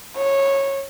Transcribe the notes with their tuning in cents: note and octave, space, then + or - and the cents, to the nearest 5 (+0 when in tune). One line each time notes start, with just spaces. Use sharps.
C#5 -15